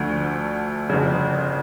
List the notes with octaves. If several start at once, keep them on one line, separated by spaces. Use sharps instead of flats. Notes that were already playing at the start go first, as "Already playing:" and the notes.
Already playing: D2 D3 F3 A3
G1 F2 C#3